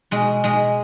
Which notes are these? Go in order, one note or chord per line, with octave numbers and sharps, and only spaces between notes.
B2 G#3
B2 G#3